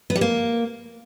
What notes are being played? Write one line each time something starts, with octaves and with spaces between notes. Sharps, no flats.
B3
G3
A#3